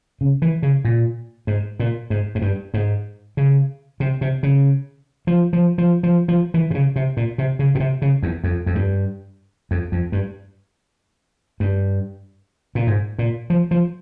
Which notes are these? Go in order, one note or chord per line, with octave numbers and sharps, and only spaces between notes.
C#3
E3
C#3
A#2
G#2
A#2
G#2
G#2
G2
G#2
C#3
C3
C3
C#3
F3
F3
F3
F3
F3
E3
C3
C#3
C3
A#2
C3
C#3
A#2
C3
C#3
E2
F2
F2
G2
F2
F2
G2
G2
A#2
G#2
A#2
F3
F3